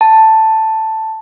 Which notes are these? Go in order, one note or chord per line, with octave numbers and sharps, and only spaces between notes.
A5